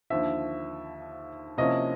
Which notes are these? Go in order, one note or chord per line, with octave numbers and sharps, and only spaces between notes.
D#2 D3 F3 E5
C3 F3 A#3 C#4 E4 D#5